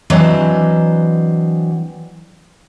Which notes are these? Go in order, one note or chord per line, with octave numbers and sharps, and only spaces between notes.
E3 F#3 C4 D4 D#5